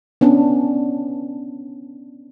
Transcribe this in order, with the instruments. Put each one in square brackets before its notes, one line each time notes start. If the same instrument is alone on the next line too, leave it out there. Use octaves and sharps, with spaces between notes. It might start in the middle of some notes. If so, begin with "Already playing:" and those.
[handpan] B3 C#4 D4